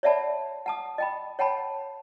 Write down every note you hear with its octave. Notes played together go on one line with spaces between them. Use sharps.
C#5 D5 E5 F#5 A5 B5
F#5 A5 D#6
D#5 G5 B5
C#5 F#5 G5 A5 B5